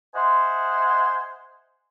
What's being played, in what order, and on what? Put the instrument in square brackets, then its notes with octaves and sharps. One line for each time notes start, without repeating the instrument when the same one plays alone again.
[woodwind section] C5 D#5 E5 F#5 G#5 C6